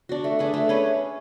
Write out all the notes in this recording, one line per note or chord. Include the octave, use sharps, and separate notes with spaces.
D4 F#4
A3
D4 G#4 B4
A3
C#4 G#4 B4